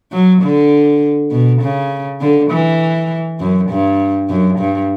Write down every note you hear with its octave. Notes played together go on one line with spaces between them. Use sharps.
F#3
D3
B2
C#3
D3
E3
F#2
G2
F#2
G2